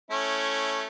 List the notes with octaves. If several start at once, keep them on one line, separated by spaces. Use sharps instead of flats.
A3 C#4 E4